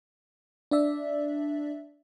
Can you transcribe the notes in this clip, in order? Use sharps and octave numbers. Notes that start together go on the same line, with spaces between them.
D4 D5 E5